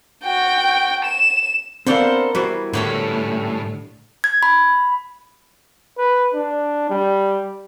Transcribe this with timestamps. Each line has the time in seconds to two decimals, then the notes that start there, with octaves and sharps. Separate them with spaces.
0.24 F#4 G5
1.05 E7
1.87 B3 C4 D4 A4 A#4 C5 D5 F5
2.35 E3 G3 F#4 C5
2.73 A2 D3 A3 C#4 B4
4.24 G#6
4.43 B5
5.98 B4
6.34 D4
6.90 G3